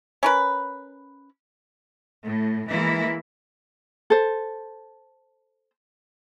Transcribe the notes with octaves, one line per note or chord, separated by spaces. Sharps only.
C#4 A#4 B4
A2
E3 G#3 A#3 E4
A4 C5